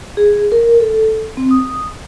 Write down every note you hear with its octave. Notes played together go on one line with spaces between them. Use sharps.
G#4
A#4
A4
C4
D#6